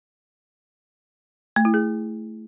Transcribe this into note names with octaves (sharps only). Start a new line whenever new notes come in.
A3
E4
G#4